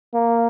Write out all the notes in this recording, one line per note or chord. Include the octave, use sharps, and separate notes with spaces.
A#3